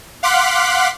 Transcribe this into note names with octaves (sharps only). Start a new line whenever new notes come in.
F5 F#5 C6 D6 F#6 B6